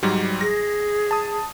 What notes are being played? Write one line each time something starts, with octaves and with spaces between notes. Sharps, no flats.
G#2 F#3 G3
G#4 A#6
A5 D#6